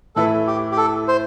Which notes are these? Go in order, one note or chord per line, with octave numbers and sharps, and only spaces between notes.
A2 E3 A3 E4 A4 B4
G4
G4
A4
C5